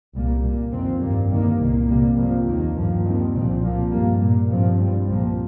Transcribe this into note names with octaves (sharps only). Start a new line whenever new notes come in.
C2 A#2 G3 A#3
A#2 A#3
F2 D#3 C4
G2 G3 A#3
G2 D#3 A#3
C2 A#2 A#3
C2 C3 G3 A#3
F2 F3 A#3
D#2 D#3 A#3
G2 F3 A#3
D#2 D#3 G3 C4
C2 A#2 F3 C4
A#2 F3 A#3
G2 G3 A#3
A#2 A#3
G2 F3 C4
G2 G3 C4
C2 A#2 F3 A#3